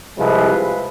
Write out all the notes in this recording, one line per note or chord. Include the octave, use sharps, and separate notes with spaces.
C2 C3 F3 G#3 B4